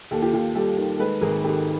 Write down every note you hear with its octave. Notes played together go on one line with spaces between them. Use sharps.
D#2 G4 A4
F4 G4
D#2 F4 G4
G3 G4 A4
D#3
G#3 A4 B4
G#1 G#4 A#4
D#3 G4 A4